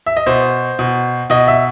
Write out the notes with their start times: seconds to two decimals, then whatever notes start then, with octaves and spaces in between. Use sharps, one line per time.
0.06 E5
0.17 D#5
0.27 B2 C5
0.79 B2
1.30 B2 D#5
1.48 E5